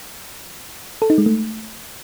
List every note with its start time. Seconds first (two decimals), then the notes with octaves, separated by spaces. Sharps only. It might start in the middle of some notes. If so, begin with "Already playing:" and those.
1.02 A4
1.10 D#4
1.18 G#3
1.26 A3